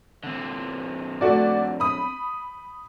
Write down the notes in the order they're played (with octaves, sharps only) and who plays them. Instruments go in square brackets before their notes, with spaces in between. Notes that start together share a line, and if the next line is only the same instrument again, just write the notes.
[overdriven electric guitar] D3 C4
[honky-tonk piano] A3 F#4 D5
B5 D#6